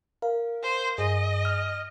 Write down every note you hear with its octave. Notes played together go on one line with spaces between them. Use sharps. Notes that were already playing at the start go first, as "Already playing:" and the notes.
A#4 F5
C5
G2 G#4 D#5
F6